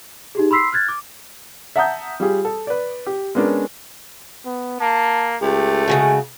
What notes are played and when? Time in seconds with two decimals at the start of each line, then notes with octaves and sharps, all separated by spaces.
0.35 D#4 G4 G#4
0.51 B5 C6 E6 B6 C7
0.72 F6 F#6 G#6 A6
0.89 D6
1.76 E5 F#5 A5 A#5 D#6 G6
2.20 G3 F4 G4 G#4
2.45 A4
2.67 B4 D5
3.06 G4
3.35 G#3 B3 C#4 D4 A#4
4.45 B3
4.80 A#3 A5
5.42 C#2 A3 G4
5.88 C#3 F3 G#3 F#4